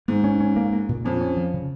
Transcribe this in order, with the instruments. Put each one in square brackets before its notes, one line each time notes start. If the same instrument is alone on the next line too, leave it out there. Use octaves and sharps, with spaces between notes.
[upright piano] G#2 [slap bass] A#3
[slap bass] C#4
C#4
A#3
A#3
A#2
[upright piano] F2 [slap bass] C#4
[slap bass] C#4
F3
C#3